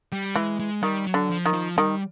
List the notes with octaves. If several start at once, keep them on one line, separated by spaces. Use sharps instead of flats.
G3
E3 G#3
G#3
D#3 G3
F#3
D3
F3
D#3
F3
D#3 G3